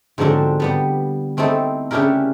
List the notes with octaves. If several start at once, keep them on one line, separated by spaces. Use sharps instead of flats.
G#2 D3 F3 F#3 C4 D4
G3 B3 G4
A3 C4 D#4 E4 A4
C#3 C#4 D4 E4 G4 A#4